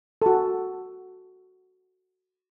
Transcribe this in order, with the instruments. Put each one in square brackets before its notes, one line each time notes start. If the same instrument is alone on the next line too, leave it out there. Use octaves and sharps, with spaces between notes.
[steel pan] F#4 A4